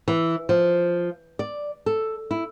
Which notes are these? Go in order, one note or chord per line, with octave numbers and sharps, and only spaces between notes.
E3
F3
D5
A4
E4